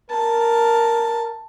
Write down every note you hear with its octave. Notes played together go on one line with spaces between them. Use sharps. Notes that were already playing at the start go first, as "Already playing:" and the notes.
A#4 A5